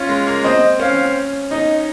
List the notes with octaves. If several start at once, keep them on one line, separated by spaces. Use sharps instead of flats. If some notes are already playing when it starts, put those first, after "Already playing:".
Already playing: C#4 F4
G#3
A#3
C4 D#5
C#4 F5
D#4 D#5